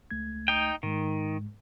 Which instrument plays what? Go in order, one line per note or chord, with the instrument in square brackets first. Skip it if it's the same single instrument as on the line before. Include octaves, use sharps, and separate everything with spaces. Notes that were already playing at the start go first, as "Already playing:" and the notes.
[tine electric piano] C#2 A3 G#6
[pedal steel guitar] D#4 G5
[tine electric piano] G#2 G#3 [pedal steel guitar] D#3